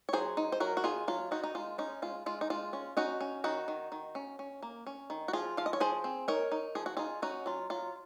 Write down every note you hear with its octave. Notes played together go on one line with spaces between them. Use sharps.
C#5
F#3 G#4 C5
D#4
C5
F#3 F#4 A#4
F#4
D#3 F4 G#4
F#3 F4
D#3 D#4 F#4
D#4
G#3 F4
C#4 D#4
G#3 F4
G#3 F4
D#4
G#3 F4
C#4
C#4 D#4 F#4
C#4
D#3 D#4 F#4
D#3
D#3
C#4
C#4
A#3
C#4
D#3
F#4
F3 F4 G#4
F3 F5
D#5
C#5
F3 G#4 C5
C4
D#4 A#4 C#5
D#4
F3 G#4
F#4
D#4 F4 G#4
C#4 D#4 F#4
F#3 F4
F#3 F4